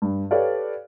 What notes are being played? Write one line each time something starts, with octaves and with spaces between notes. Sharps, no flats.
G2
G4 A4 B4 C#5 D5 F5